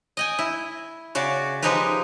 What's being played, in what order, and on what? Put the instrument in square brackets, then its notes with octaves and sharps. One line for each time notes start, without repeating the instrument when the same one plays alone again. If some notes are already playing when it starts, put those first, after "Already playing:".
[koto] D#5 G5 G#5
E4
C#3 F#4 D5
F3 G#3 D#4 G4 B4